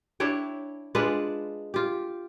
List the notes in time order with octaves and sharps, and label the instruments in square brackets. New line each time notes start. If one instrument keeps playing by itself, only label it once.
[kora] D4 E4 C#5 G5
G#3 D4 F4 B4
F4 G4